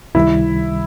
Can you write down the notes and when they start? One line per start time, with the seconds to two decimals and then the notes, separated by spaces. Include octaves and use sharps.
0.15 C#2 C3 D#3 G3 E4